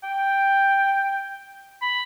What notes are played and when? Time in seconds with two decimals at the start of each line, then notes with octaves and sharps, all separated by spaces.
0.04 G5
1.82 B5